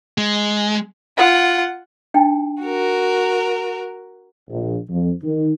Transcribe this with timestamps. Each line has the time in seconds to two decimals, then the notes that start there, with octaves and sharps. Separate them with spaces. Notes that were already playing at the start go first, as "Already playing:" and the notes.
0.18 G#3
1.17 F4 F#5
2.14 D4 D#4 G5
2.62 F#4 A#4
4.50 A#1
4.89 F2
5.24 D#3